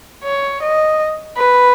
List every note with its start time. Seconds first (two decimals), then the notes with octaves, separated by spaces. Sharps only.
0.24 C#5
0.62 D#5
1.38 B4